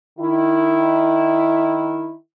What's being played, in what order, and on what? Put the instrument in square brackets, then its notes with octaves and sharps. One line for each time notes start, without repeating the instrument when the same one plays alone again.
[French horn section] D#3 E4